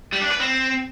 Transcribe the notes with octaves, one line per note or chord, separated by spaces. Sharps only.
G3
D4
B4
C4